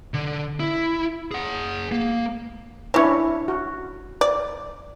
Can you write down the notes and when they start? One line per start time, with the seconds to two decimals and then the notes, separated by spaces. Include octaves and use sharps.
0.14 D3
0.60 E4
1.32 G#4 F#5
1.92 A#3
2.94 E3 C#4 D4 E4 C#5
3.48 F#4
4.21 D5